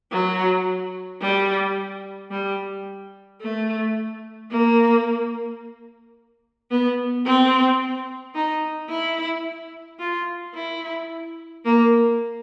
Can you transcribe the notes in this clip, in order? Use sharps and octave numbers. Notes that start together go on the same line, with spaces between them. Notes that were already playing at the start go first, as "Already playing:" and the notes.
F#3
G3
G3
A3
A#3
B3
C4
D#4
E4
F4
E4
A#3